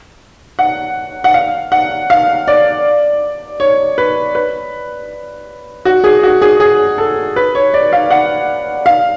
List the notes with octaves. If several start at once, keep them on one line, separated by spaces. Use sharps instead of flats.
F#5
F#5
F5
F#5
F5
D5
C#5
B4
B4
F#4
G#4
F#4
G#4
G#4
A4
B4
C#5
D5
F5
F#5
F5